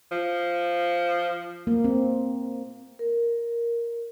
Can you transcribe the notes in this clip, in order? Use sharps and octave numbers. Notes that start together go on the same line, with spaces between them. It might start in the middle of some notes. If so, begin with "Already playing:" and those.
F3
A#3
C4
A#4